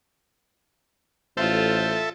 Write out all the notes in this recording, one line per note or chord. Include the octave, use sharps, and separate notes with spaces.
A1 F4 A4 C5 E5